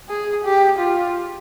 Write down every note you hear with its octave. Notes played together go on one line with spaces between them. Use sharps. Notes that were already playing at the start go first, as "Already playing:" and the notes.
G#4
G4
F4